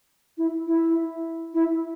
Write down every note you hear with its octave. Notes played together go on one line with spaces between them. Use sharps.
E4
E4
E4